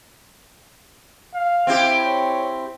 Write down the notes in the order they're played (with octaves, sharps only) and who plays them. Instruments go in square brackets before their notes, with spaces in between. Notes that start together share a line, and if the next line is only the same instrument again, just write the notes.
[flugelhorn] F5
[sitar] C4 E4 G4
[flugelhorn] C#5